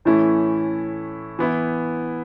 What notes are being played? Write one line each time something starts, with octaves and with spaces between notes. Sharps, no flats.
A2 E3 A3 C#4 E4
E3 B3 E4